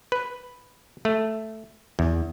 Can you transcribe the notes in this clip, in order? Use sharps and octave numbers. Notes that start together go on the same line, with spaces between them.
B4
A3
E2